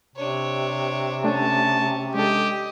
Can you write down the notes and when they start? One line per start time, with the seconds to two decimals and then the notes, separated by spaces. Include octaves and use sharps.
0.16 C3 D4 C#5
1.24 A3 C#4 D4 A5
2.15 G#3 D4 G4 A4 D#5